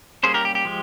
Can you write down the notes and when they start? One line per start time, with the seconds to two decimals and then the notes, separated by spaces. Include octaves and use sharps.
0.23 G3 A#3 C#4 G#4 C5
0.34 G4 A#4
0.45 G4
0.55 G4
0.65 F3 G#3